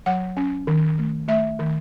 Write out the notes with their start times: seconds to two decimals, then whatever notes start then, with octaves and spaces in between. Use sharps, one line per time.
0.06 F#3 F#5
0.37 C#4
0.67 D#3
0.99 A3
1.28 A3 E5
1.59 D#3